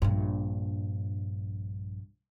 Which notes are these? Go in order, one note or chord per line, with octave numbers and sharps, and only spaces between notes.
A#1 G2